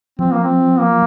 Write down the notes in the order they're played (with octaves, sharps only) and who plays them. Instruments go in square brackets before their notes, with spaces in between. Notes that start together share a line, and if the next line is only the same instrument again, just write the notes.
[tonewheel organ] F3 [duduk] C4
[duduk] A#3
C4
A#3